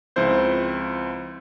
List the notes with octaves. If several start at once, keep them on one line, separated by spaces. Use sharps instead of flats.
C#2 F3 C4 E4 C5 G6